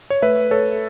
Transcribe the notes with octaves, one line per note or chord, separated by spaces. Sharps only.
C#5
A3 B4 E5
A4 C#5